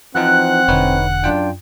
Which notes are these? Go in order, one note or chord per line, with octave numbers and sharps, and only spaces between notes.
E3 F3 C4 D#4 F#5 F#6
E1 D3 D#4 B4 C#5
F#2 D4 F4 G5